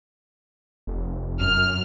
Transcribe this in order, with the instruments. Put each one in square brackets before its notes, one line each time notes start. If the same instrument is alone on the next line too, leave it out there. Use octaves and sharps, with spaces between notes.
[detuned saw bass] F1
[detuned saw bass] F#2 [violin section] F6